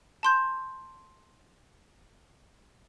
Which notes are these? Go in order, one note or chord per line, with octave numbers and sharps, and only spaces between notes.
A5 C6 G6